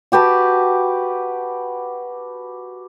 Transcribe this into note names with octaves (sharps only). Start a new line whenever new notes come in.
F#4 G4 B4 A5